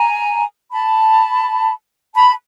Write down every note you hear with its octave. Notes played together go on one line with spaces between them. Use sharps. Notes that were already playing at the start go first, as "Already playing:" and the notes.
Already playing: G#5 A#5
A5 B5
A5 B5